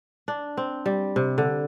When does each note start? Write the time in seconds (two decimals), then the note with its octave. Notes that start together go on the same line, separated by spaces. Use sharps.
0.28 D4
0.57 C4
0.86 G3
1.16 C3
1.38 D3